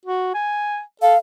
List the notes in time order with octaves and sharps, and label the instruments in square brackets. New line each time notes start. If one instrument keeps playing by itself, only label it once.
[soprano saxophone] F#4
G#5
[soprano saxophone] A4 [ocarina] F5